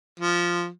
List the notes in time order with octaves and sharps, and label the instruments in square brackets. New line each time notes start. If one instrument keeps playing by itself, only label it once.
[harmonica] F3